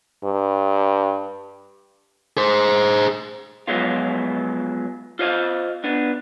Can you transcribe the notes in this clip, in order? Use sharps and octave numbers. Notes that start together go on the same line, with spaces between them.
G2
G#4 C5
F3 F#3 G#3 B3 F4
F4 C5 D#5 F5
B3 D4